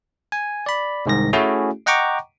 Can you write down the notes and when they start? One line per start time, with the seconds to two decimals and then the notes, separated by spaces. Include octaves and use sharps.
0.32 G#5
0.66 D5 B5
1.06 C2 G#2 D#3 A#6
1.33 A3 C#4 E4 F#4 G#4
1.86 D#5 F#5 G5 A#5 C#6 D6